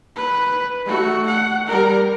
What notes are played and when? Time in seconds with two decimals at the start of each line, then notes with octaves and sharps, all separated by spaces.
0.15 B4
0.86 A3 F#4
1.26 F#5
1.67 G3 A#4